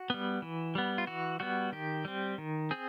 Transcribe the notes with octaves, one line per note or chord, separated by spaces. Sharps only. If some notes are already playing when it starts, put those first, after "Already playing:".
Already playing: F#4
G3 B3
E3
G3 B3
F4
E3 F#4
G3 B3 F#4
D#3 G4
G3 C4
D#3
C4 G#4